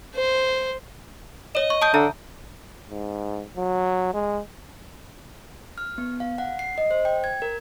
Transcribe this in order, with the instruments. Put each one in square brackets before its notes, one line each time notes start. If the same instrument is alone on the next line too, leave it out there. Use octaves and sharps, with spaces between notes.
[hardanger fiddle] C5
[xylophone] C#5 E7 [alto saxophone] D#5
[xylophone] C#6
A5 D#6 G6
[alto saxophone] D3 [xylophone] E5 A#5
[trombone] G#2
F#3
G#3
[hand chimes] F6
B3
F5
F#5
C7
D#5
C5
G5
G#6
A#4